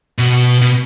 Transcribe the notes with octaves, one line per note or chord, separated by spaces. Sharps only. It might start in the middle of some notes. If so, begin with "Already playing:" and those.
B2
B2